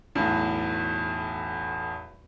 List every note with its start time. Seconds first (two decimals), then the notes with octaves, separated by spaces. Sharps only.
0.15 B1 E2 A2